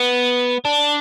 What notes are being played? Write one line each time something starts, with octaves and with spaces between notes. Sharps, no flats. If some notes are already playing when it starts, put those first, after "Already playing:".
Already playing: B3
D4